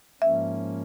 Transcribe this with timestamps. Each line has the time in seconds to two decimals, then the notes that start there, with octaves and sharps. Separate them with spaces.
0.21 G#2 F3 A#3 C#4 E5